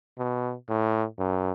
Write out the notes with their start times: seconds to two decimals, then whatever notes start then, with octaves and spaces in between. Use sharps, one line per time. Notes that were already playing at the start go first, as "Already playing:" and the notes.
0.18 B2
0.69 A2
1.19 F#2